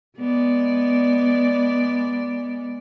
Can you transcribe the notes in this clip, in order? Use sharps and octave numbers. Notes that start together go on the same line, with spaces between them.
G#3 B3 D5